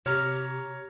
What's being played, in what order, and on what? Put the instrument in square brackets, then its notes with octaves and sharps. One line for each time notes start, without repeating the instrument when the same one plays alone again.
[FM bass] C3 [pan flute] G4 [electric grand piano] C#5 A#5 [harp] F6